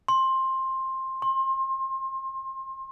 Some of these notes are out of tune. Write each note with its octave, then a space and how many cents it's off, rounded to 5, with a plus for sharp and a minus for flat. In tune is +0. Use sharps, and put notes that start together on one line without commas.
C6 +15
C6 +30